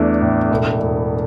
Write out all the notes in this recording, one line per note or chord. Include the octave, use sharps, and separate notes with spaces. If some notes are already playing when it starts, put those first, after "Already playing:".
Already playing: E2 A3 D4
A2
E1
E1